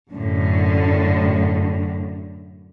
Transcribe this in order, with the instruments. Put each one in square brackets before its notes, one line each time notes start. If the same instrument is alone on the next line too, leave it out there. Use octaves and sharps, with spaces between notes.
[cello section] F#2 A2 D3